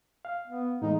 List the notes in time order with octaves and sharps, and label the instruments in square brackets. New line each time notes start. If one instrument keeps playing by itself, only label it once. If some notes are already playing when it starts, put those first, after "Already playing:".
[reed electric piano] F5
[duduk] B3
[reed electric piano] A2 E3 G#3 [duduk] D#4